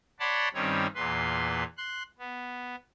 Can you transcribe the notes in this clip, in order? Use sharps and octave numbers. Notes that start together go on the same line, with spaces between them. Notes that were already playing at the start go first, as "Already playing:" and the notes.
C#5 D5 F#5 A5 B5 C6
G2 D#3 G3 C4 C#4 C#5
E2 A#2 B4 C6
C6 F#6
B3